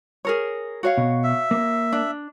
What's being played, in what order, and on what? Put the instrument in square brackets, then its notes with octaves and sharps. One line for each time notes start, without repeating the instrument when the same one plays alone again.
[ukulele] G#4 A#4 C#5
F#4 C#5 F5
[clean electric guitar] B2
[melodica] E5
[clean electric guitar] A#3
[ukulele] D4